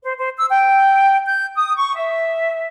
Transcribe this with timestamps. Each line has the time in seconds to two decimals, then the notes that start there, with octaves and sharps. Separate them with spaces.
0.02 C5
0.17 C5
0.38 E6
0.50 G5
1.27 G6
1.56 D#6
1.76 C#6
1.96 E5